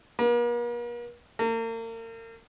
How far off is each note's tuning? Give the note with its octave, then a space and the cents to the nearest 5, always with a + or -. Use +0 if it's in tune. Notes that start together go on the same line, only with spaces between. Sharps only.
A#3 +45
A#3 -40